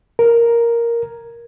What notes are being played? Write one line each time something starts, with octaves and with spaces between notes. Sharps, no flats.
A#4